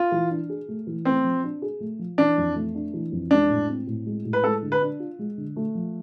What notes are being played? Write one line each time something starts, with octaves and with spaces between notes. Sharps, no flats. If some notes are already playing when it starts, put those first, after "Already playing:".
Already playing: F4
E3
D4
G#4
A3
E3
A3 C4
F3
D4
G#4
A3
F3
E3 D4
F2
A3
D4
E3
F2
G#3 D4
A2
C4
A2
G#3
A2
B4
G#3 A4
D3
B4
D4
F4
G#3
D3
A3
F3